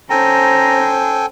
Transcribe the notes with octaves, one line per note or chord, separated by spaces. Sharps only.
C#4 A4 C5 G5 G#5 A#5